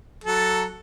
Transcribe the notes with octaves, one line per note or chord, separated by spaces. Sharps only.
F#3 A4